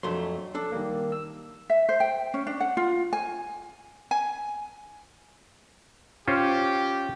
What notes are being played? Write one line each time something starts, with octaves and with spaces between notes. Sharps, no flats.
F2 F#3 A3 D4 C6
D4 A4
D#3 G3 A#3
E6
E5
C5
G5
C#4
D4
F#5
F4
G#5
G#5
C#4 F4 G4 C5